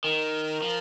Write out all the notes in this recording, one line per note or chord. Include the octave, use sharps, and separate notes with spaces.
D#3 A#4
F3